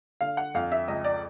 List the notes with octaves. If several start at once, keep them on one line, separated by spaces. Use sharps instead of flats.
D3 F5
F#5
F2 F5
E5
C#2 D#5
D5